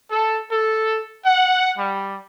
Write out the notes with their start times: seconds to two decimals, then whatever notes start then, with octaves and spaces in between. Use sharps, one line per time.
0.11 A4
0.51 A4
1.26 F#5
1.78 G3